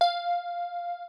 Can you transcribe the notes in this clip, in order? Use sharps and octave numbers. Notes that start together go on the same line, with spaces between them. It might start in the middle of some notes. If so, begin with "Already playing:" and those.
F5